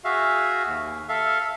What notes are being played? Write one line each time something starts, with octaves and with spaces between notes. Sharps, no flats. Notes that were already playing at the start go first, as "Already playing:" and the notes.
F#4 G#4 E5 F5
D#2
A4 E5 F5